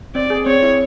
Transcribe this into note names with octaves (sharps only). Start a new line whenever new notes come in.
C4 D5
G#4
C4 C#5
E4